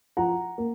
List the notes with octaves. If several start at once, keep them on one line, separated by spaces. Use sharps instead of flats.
F3 F#5 A#5
A#3